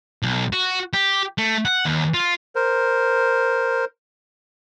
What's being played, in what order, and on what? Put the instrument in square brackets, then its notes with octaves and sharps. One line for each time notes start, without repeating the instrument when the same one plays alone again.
[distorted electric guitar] B1
F#4
G4
A3
F#5
D#2
F4
[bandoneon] A#4 C5